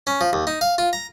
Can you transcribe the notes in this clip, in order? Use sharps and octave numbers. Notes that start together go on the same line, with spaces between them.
C#4
F3
D#2
D#4
F5
F4
A#5